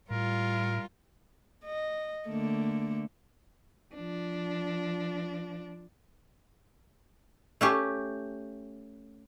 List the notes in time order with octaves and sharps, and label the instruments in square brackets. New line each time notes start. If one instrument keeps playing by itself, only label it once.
[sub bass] A2 [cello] G3 F4 [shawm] A#4
[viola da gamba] D#5
D3 A3 A#3
[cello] F3 D4
[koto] A3 C#4 G4